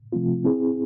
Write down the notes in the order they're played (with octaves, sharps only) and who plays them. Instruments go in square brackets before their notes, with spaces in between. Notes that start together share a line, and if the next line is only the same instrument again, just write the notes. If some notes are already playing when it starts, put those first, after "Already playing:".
[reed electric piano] C3 F3 A3 C4 F4
C4 E4 G#4